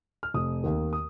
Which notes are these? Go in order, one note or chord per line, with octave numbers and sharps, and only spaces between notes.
F6
F1 D#6
D#2 D#3
D#6